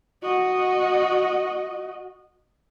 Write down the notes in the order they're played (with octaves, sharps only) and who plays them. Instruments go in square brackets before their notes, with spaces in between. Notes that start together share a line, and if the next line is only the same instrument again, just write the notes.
[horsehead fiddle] F#4 D#5